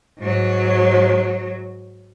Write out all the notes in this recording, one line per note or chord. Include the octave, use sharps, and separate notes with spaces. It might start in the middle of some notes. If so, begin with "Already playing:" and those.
G#2 F#3